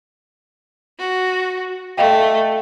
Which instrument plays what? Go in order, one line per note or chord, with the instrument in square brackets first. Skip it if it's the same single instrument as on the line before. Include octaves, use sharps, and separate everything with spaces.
[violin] F#4
[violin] A3 [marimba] D#5 F5 G5